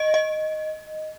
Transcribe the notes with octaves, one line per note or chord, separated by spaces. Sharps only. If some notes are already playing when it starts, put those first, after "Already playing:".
Already playing: D#5
D#5